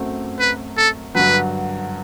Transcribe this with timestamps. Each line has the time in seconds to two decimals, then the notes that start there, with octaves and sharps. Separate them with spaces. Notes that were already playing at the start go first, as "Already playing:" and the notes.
Already playing: F#2 F#3 A3 C4
0.40 B4
0.77 A4
1.15 G2 D3 F#3 B4